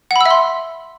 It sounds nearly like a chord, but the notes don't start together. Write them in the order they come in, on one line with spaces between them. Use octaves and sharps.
F#5 B5 E6 E5 C6